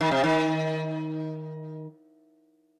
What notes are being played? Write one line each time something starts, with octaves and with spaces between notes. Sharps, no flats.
D#3
C3
D#3